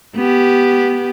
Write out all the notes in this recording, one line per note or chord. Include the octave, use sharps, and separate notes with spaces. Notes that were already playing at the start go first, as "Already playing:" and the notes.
B3 G4